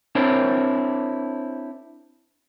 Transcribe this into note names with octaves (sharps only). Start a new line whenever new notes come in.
C4 D4 E4 A#4 C5 C#5